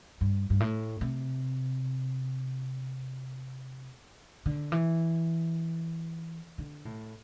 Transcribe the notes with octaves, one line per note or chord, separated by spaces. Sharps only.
G2
G2
A2
C3
D3
E3
D3
A2